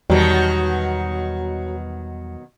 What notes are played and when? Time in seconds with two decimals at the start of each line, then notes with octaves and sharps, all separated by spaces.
0.10 E2 B2 D#3 F#3 G3 F#4 C#5 A#5